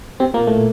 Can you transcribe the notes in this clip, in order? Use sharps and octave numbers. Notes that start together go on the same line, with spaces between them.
C3 C4
A#2 A#3
A2 A3